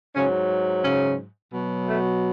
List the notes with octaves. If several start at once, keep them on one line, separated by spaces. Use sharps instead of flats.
G#2 C#3 F#3 C#4
C#3 C#4
B2 F#3
A3